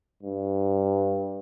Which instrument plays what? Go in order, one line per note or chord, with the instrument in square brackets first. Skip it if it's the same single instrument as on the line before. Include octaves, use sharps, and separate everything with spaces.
[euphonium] G2